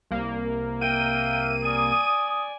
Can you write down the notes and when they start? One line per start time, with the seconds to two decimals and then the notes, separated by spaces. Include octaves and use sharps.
0.11 C2 A#3
0.81 E5 F5 G5 D#7
1.64 D5 G#5 D#6